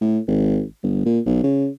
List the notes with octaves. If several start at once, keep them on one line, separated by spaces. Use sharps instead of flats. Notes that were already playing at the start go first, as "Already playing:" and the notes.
A2
G#1
G1
A#2
B1
C#3